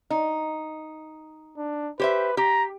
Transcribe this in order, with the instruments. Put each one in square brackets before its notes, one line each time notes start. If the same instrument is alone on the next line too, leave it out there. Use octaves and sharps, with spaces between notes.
[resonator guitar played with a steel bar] D#4
[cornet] D4
[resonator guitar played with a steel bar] G4 C5 E5 [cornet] B4
[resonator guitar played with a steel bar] G4 [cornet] A#5